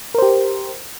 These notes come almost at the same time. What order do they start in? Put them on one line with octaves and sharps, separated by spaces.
A#4 C5 G4